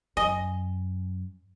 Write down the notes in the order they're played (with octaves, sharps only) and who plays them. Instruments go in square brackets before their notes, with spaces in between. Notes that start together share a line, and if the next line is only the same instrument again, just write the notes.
[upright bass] F#2 [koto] D#5 [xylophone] G#5